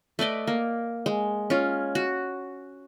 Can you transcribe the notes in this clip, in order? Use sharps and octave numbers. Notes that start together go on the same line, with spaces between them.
A3 B4 D5 D#5
A#3
G#3
C#4 F4
F#4